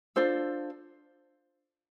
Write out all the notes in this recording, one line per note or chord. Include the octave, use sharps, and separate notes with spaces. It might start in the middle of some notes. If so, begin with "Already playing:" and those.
D4 F4 A4 C5